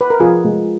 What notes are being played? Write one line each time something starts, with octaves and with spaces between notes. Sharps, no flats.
B4
A#4
F3 F4 G#4
G#3